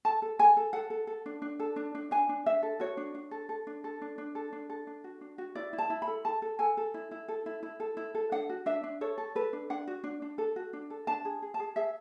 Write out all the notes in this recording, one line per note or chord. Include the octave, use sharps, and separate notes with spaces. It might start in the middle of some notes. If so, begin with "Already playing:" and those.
A4 A5
A4
A4 G#5
A4
A4 F#5
A4
A4
D4
D4
A4
D4
D4
D4 G#5
D4
D4 E5
A4
F#4 C#5
D4
D4
A4
A4
D4
A4
D4
D4
A4
D4
A4
D4
F#4
D4
F#4
E4 D5
E4
A5
E4
B5
A4
A4 A5
A4
A4 G#5
A4
E4
E4
A4
E4
E4
A4
E4
A4
D4 F#5
F#4
D4 E5
D4
A4 C#5
A4
A4 B4
D4
D4 F#5
F#4
D4
D4
A4
F#4
D4
A4
D4 A5
G#4
G#4
A5
G#4
G#4 E5